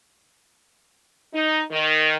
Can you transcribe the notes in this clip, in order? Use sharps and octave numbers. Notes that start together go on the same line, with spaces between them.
D#4
D#3